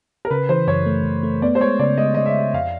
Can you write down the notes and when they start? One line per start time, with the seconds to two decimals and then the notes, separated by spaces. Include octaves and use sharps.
0.25 A#4
0.30 C#3 B4
0.49 E3 C5
0.67 F#2 C#5
0.86 A3
1.05 F#2
1.23 A3
1.42 B3 D5
1.55 C5
1.60 G#3 C#5
1.79 C#3 D5
1.98 G#3 D#5
2.14 C#3 D#5
2.26 E5
2.35 C#3
2.53 F2 F5